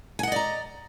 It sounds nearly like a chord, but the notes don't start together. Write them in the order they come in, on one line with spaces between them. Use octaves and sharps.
G#5 F#5 D#5 D5 A#5